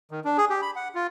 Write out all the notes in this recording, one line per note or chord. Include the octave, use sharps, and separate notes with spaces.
D#3
D4
G#4
G4
B5
F#5
F4